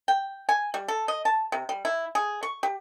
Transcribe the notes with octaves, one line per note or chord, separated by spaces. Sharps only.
G5
G#5
G3
A4
D#5
A5
C3
G3
E4
G#4
C#6
G4